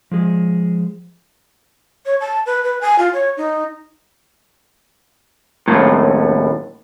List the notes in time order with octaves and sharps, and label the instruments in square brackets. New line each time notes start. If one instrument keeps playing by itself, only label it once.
[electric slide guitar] F3 G#3 G#4
[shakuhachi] C#5
A5
B4
B4
G#5
F4
C#5
D#4
[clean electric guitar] D#2 A2